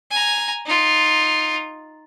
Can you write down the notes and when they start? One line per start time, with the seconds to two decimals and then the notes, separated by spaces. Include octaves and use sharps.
0.11 G#5 A#5
0.66 D#4 F4